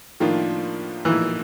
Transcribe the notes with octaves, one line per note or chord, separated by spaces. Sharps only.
A2 D#3 F3 A#3 D4 F4
A#2 E3 F3 A#3 D#4